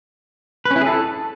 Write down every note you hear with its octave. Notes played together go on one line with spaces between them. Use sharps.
B4
C#4
E4
G#4
A4